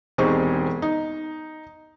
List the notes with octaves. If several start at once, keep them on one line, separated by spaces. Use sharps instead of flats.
E1 C4 D#4 G4 G#4 C#6
D#4